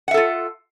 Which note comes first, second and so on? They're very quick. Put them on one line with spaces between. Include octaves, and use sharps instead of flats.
F#5 E5 A4 F4